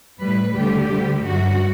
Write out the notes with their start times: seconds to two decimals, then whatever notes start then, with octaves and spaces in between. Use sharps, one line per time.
0.20 A2 G3 B4
0.55 D2 D3 G3 G4
0.89 D2 D3 G3
1.25 G2 F#3 F#4